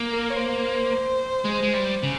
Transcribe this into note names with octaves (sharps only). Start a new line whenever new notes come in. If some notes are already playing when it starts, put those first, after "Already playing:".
Already playing: A#3
A#4
C#5
C5
G#3
G#3
G3
C#3